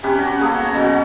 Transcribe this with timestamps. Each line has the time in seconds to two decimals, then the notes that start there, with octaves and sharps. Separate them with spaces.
0.03 C3 C#4 G4 B4
0.18 C#4 F#4
0.39 C#3 A#3 B3 A4
0.59 C#5 A#5
0.74 B2 F#3 F#4